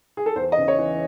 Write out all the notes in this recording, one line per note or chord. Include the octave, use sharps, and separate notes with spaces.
G#4
A4
E2 C5
D#5
C#3
C#5
E3